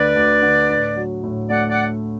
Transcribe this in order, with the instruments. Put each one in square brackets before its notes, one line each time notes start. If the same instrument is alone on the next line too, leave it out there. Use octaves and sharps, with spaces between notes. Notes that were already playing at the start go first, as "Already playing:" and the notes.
Already playing: [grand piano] D2 D3 A3 D4 [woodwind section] B4 D5
[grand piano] D2
D3
A2
F#3
A2
[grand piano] A3 [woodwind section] D5 F#5
[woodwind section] D5 F#5